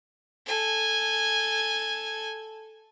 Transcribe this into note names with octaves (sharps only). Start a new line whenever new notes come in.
A4 G#5